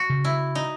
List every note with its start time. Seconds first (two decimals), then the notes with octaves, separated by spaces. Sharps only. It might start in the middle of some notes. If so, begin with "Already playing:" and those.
Already playing: F#4
0.10 C#3
0.25 E4
0.55 D#4